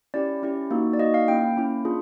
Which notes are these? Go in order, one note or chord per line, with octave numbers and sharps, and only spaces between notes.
C#4 E4 G4 D5
C#4 E4 G4
A#3 D#4 F#4
D5
A#3 D#4 F#4 D#5
F5
A#3 C#4 E4 G5
A#3 C#4 E4
D4 F4 G#4